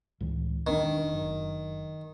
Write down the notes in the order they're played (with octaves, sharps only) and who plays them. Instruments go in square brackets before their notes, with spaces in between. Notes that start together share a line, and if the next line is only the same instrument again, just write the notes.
[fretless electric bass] C#2 A2 E3
[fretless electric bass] E1 C4 D4 [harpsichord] D#3
[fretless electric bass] F#1